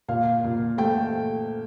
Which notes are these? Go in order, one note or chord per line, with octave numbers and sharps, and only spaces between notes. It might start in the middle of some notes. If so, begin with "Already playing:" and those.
A#2 F5
A#2
A3 G5